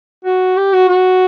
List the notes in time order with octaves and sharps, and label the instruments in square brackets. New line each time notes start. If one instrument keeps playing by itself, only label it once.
[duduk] F#4
G4
F#4
F#4